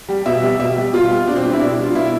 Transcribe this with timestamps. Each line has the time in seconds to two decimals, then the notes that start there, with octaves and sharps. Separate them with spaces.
0.09 G3
0.26 B2 E5
0.43 G3
0.59 B2 E5
0.77 G3
0.93 B2 F4
1.11 G3
1.28 B2 D4
1.36 C4
1.44 G3 D4
1.53 E4
1.61 B2 D4
1.79 G3
1.84 F4
1.95 B2 E4